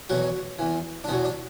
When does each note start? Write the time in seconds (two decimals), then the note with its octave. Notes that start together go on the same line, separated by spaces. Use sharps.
0.09 E2 B2 F#3 F#4
0.59 E2 E3
1.04 D4
1.08 E2 B2 F#3 B3
1.25 D4